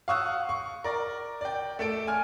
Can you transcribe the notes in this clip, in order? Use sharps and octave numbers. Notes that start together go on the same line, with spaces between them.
F5 F#5 C#6 D#6 E6 F#6
C#6
A#4 D5
D5 G5
A3 A4 D7
G#5 F6